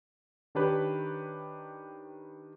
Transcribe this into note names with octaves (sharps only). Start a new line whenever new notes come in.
D#3 D4 G4 B4 C#5